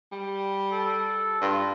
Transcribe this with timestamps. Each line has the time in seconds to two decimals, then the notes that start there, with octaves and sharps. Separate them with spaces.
0.12 G3
0.72 A4
1.41 G2 F4